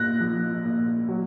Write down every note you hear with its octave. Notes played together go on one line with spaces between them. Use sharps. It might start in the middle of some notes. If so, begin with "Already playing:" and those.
Already playing: A#2 F#6 A#6
F3
A#2
F#3